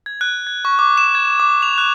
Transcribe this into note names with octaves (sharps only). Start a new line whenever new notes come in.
G#6
F#6
G#6
C#6
D6
E7
G#6
D6
F7
F#6